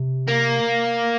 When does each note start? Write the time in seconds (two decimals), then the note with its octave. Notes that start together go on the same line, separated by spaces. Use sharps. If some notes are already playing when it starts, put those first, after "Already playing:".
Already playing: C3
0.28 A#3